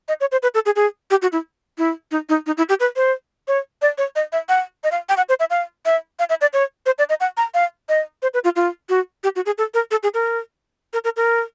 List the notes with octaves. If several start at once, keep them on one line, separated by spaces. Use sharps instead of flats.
D#5
C#5
C5
B4
A4
G#4
G#4
G4
F#4
E4
E4
D#4
D#4
D#4
E4
G4
B4
C5
C#5
D5
C#5
D#5
E5
F#5
D#5
F5
G5
F#5
C5
E5
F5
E5
F5
E5
D5
C#5
C5
D5
D#5
F#5
A#5
F5
D#5
C5
B4
F4
F4
F#4
G4
F#4
G#4
A4
A#4
A4
G#4
A#4
A#4
A#4
A#4